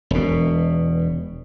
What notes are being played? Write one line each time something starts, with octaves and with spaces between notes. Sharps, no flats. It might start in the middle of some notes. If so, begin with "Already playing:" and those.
E1 B2